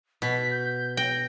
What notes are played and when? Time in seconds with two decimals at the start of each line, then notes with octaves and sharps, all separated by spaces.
0.22 B2 B6
0.51 G6
0.97 G5 A#6